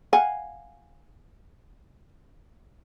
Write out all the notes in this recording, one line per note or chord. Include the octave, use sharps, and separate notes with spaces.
F5 F#5 G#5